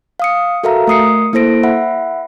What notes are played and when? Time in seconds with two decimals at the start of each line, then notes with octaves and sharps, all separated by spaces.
0.20 F5 D#6 C#7
0.63 F#4 A4 A#4 E5 F5 A#5
0.87 A3 A#4 D#6 C7 C#7
1.33 A#3 E4 A4 C5 A#6 D7
1.63 E5 F#5 B5